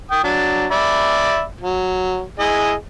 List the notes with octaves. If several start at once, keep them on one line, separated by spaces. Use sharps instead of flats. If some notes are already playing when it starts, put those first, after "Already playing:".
G5 D#6
F#3 D4
D5 E5 B5
F#3
E4 G#4 D#5